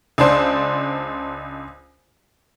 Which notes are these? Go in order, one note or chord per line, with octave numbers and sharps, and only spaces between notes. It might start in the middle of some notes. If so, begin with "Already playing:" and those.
C#2 D4 C5